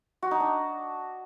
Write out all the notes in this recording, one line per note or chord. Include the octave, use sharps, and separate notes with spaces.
F#4
D#4
D4